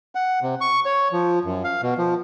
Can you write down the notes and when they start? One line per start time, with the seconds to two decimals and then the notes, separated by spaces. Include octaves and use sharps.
0.15 F#5
0.42 C3
0.61 C#6
0.85 C#5
1.12 F3
1.45 F#2
1.64 F5
1.82 B2
1.98 F3